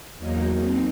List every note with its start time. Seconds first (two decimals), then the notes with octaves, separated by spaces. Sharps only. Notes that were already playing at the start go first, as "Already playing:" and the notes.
0.17 E2 F#3 A#3 D#4
0.58 C4 D#4